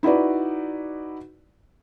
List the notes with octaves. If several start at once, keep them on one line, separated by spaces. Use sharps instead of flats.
D#4 E4 F#4 B4 D5